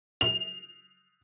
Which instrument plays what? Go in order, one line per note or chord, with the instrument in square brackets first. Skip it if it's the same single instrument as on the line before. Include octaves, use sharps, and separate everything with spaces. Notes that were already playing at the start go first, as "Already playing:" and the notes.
[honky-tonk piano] F7